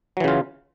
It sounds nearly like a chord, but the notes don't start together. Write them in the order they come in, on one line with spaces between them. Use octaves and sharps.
F#3 E3 C#3 F4